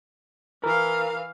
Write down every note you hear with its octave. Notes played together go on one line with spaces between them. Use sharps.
E3 A#4 F5